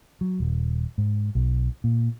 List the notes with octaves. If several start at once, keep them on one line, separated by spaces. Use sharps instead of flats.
F#3
D#1
G#2
B1
A#2